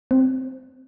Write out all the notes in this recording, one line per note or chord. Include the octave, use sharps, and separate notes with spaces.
C4